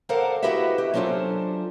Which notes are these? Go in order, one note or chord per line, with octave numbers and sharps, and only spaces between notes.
A4 A#4 C5 D5 F5 F#5
E4 F#4 G4 B4 D#5 E5
G4
F#3 C#4 D4 F4 A4 C5